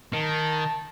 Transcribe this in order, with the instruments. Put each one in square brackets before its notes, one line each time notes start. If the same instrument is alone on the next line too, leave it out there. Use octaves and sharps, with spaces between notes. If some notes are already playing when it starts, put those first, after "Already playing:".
[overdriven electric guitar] D#3 [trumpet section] A5